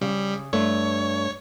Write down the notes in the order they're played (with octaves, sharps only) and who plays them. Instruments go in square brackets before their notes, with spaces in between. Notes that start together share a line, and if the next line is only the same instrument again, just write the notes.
[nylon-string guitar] C#3 [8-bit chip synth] G3
[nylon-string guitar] G2 A3 [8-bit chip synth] C#5